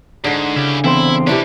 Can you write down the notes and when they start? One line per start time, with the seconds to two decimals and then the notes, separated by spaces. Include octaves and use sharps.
0.24 G#2 D3 G#4
0.56 C#3 E4 G4
0.84 E2 C4 E4 C5
1.27 C3 E3 D4 G4 C#5